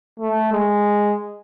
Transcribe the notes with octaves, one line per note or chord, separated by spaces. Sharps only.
A3
G#3